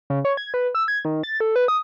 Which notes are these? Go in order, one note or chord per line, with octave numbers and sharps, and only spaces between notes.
C#3
C#5
G#6
B4
E6
G#6
D#3
A6
A4
B4
D#6